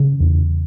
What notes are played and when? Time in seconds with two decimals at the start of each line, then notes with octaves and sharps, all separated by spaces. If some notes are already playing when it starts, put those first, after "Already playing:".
Already playing: C#3
0.20 E2